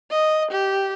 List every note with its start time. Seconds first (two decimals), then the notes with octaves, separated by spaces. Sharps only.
0.11 D#5
0.51 G4